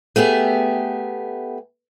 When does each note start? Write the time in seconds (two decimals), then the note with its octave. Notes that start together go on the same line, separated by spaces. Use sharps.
0.16 A3 B3 G4 G#4